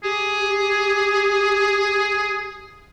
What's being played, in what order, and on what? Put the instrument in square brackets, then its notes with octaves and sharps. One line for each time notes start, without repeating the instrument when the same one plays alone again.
[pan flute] G4 [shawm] G#4